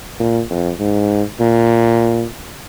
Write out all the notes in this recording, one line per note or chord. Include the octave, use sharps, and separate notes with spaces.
A#2
F2
G#2
A#2